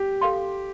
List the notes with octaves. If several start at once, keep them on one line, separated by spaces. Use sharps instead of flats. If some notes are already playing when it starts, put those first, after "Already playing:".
Already playing: G4
A4 F5 C6